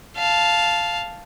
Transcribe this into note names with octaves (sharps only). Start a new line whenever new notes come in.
F5 A5